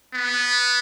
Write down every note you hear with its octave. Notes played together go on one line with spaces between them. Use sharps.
B3